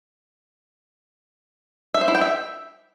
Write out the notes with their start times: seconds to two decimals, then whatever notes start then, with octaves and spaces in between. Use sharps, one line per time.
1.94 E5
2.01 C5
2.08 E4
2.15 G5
2.21 E5